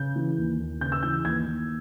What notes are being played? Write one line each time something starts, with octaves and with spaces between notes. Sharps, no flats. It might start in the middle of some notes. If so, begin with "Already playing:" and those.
Already playing: C#3 G6
E3
D#2
D#2
C#3 G6
E6
E3 G6
D#2 G#6
D#2